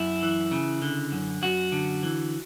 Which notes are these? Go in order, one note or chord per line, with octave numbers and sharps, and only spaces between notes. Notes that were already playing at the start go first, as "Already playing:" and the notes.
Already playing: F#2 E4
E3
C#3
D3
F#2
F#2 F#4
D3
E3